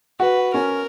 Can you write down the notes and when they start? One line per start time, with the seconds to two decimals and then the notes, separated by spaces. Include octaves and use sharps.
0.20 F#4 B4
0.54 C#4 A#4